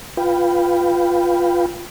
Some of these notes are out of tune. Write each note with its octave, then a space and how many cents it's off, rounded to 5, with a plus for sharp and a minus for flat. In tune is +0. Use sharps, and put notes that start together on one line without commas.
F4 +0 B4 +5 G5 +0